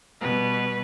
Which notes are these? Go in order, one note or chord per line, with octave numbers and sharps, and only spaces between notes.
B2 G3 B4